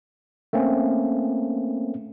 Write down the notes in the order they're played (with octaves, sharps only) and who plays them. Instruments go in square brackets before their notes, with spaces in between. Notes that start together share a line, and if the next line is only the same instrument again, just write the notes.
[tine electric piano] A3 A#3 C4 C#4